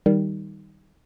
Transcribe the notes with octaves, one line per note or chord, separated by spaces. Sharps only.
D#3 G3